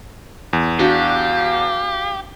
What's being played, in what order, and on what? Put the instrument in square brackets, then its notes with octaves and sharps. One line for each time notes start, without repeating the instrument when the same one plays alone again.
[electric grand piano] E2
[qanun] D4 F#4 [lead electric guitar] G4 [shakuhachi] F5